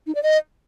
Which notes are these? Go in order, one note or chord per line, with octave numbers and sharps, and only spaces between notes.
D#4
D5
D#5